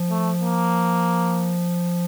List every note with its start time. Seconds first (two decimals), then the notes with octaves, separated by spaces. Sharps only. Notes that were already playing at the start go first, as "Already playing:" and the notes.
Already playing: F3
0.10 A3
0.40 A#3